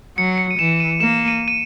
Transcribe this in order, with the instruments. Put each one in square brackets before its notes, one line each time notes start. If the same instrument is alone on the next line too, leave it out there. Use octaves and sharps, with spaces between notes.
[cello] F#3 [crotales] C#7
[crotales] C#7
D#7
[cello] E3 [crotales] E7
[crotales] D#7
[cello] A#3 [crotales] E7
[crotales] D#7
D#7